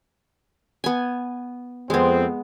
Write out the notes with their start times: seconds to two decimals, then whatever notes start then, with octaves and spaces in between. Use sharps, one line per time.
0.84 B3 G#5
1.90 F2 G#3 B3 C4